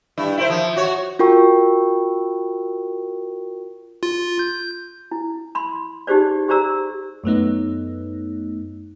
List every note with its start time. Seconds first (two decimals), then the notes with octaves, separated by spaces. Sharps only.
0.18 G2 E4
0.37 E4 A#4 C5
0.50 F3
0.76 F#4 C#5
1.19 F4 F#4 A#4 G5 C#6
4.03 F4
4.39 G6
5.11 E4
5.55 B5 C6
6.07 D#4 G4 G#4 C5 D5
6.48 G4 G#4 C5 D5 A#5 E6
7.24 F#2 A3 B3 D#4